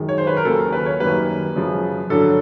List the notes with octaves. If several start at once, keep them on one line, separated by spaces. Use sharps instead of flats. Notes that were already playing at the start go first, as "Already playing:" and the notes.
Already playing: F#2 D#3 G#3
C#5
C5
B4
A#4
D#2 C#3 F#3 A#3 A4
A#4
B4
C#5
F#2 D#3 G3 A#3 B4
F#2 C#3 F3 G#3
G2 D3 F#3 A4